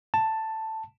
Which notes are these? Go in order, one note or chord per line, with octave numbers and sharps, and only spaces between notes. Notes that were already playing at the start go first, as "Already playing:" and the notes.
A5